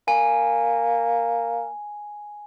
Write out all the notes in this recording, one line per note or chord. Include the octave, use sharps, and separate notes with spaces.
A#3 G#5